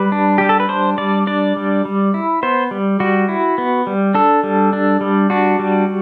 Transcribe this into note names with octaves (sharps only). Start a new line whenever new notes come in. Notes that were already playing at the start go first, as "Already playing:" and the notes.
Already playing: G3 B4
D4
G3 G4
A4
B4
D4 C5
G3 D5
D4 D5
G3
G3
E4
B3 C5
G3
G3 F#4
E4
B3
G3
D4 A4
G3
D4
G3
D4 F#4
G3